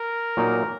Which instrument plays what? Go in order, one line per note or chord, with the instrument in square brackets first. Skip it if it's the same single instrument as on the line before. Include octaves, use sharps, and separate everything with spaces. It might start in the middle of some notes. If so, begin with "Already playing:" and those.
Already playing: [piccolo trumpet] A#4
[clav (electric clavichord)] A#2 F#3 A#3 D#4